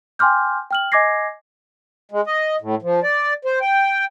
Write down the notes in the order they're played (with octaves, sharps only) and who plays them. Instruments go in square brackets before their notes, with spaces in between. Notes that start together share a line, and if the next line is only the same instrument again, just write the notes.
[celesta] G5 G#5 C6 D6 F6 G6
G5 F6 F#7
D#5 G#5 D6 G#6 A#6 C7
[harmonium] G#3
D#5
A2
F3
D5
C5
G5